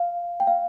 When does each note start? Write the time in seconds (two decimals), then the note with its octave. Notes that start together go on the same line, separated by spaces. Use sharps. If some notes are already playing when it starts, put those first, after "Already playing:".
Already playing: F5
0.40 G5
0.47 F5